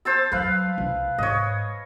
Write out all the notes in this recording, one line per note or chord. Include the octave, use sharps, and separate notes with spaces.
C5 A5 E6
F#3 G3 B4 F5
C2
G#2 C#5 D#5